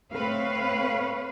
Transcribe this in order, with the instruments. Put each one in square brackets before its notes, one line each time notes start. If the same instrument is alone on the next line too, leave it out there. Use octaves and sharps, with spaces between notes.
[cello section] A3 C4 B4 C#5 F5